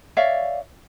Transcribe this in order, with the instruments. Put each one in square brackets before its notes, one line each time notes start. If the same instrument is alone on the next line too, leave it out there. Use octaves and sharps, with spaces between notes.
[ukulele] C#5 D5 E5 F5